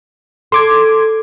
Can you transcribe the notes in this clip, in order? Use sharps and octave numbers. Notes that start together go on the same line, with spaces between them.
A4 C6 D6 G#6